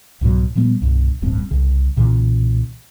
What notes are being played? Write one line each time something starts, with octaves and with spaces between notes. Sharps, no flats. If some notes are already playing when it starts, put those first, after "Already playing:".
C2 G#2 B2 F#3
A#2 F3 G3 B3
C2 G2 B2
D1 A1 G2 C4
C2 C#3
B1 A#2 C#3 E3